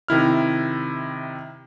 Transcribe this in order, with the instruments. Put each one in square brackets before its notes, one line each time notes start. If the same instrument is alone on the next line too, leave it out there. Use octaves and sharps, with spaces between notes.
[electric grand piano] C3 D#3 E4 F6